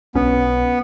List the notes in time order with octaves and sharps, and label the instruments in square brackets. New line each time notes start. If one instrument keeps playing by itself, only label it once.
[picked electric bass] B1 C#4 [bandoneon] B3